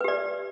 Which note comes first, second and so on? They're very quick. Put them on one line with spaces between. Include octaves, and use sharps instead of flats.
B4 G4 D5